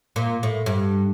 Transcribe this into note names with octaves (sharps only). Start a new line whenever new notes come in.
A#2
A2
G2